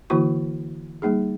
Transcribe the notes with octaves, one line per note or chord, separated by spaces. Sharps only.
D3 E3 A#3 E4 F#4 C#6
G3 A#3 D#4 G#4